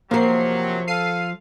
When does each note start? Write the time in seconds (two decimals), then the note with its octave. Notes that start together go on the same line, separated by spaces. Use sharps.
0.11 C3 F3 F#3 A#3 A#4 C7
0.88 A4 F5 C7 D#7